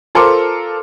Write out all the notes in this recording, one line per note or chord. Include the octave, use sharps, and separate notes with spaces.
F4 A4 A#4 C5 C6 D6